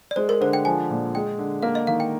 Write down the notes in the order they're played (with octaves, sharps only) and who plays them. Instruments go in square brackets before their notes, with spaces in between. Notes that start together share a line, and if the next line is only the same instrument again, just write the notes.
[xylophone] D5
[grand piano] G#3 [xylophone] C5
[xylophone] A#4
[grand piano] D3 [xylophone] C5
[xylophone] G5
[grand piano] F3 [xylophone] G#5
[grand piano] A#2
[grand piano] G#3 [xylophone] G5
[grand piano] D3
[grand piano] A#3 [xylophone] F5
[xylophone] D#5
[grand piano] D#3 [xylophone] F5
[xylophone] G5